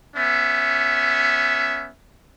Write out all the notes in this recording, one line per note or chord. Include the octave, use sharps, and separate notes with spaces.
B3 C#4 E5